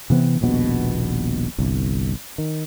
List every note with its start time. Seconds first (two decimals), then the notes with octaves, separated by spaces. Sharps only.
0.10 C3 E3 B3 C4
0.41 D#1 A#1 B2 B3
1.58 G1 C2
2.38 D#3